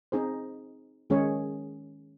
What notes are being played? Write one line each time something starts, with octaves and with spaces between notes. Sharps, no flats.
C4 D#4 G#4 C5
D#3 G#3 C#4 G#4 C#5